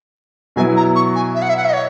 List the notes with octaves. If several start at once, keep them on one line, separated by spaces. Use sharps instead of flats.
B2 F#3 B3 E4 G#5
A#5
C#6
G#5
E5
F#5
E5
F#5
E5
D#5
C#5